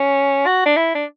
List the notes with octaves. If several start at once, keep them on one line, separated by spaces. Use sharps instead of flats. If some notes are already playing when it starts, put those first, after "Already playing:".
Already playing: C#4
F#4
D4
E4
D4